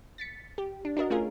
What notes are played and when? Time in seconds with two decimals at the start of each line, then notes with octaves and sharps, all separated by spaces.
0.18 A6 B6 C#7
0.58 G4
0.85 D4
0.97 D4 F#4 A#4 D#5
1.10 A3 C#4 F4 G#4 A#4